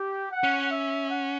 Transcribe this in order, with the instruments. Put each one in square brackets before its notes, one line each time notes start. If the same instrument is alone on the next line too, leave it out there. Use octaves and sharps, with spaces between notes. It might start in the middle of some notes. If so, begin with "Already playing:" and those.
Already playing: [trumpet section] G4
F#5
[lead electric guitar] C#4
[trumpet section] E5
F#5